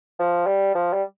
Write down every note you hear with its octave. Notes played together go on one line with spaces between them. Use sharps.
F3
G3
F3
G3